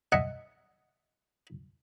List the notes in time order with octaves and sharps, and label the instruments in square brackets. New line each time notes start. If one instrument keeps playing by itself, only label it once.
[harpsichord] D#5 E5 F#5 G#5